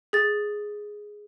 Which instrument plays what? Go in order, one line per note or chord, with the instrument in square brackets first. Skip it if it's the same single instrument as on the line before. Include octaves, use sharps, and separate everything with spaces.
[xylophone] G#4 A6